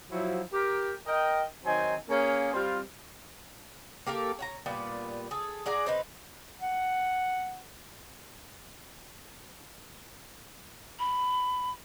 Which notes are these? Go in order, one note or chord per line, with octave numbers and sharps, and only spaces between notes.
F3 F#3 E4
G4 A#4
A#4 D#5 G5
D#3 F#3 C4 D#4 G#5
A#3 C#4 G#4
G3 C4 F4
A#3 G4 A4 A#4
C#5 F#5 A#5
A#2 G3 B3
G#4 A4
G#4 D5 F#5 A#5
C4 D#4 B4
F#5
B5